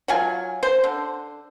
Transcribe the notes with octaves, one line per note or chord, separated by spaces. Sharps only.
F#3 F4 G#5
C5
D3